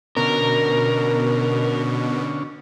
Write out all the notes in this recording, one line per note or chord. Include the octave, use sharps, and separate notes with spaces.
B2 D3 C#4 A#4